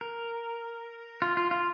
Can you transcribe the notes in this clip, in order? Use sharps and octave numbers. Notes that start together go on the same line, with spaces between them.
A#4
F4
F4
F4